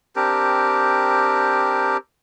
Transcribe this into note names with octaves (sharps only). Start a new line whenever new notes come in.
C4 D4 G4 A#4